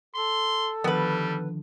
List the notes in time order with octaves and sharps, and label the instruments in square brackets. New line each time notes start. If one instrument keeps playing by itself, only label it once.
[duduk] A4 [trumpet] C6
[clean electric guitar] D3 D#3 F3 [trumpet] G3 [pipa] B3 B4